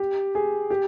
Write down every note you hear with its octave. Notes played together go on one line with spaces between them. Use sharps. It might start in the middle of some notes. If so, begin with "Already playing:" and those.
Already playing: G4
G#4
G4